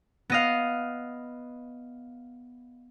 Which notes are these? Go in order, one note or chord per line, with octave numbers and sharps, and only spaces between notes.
B3 D#5 F5